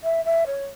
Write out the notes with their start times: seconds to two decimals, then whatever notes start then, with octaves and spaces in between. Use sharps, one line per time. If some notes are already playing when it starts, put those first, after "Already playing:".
0.04 E5
0.25 E5
0.47 C#5